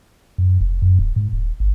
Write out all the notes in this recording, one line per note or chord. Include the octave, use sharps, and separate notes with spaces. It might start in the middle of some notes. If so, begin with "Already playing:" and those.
F#2
F1
F#2
D1
G#2
D#1
G1